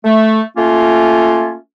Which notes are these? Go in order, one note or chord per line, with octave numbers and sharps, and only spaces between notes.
A3
A3 A#3 C#4 F4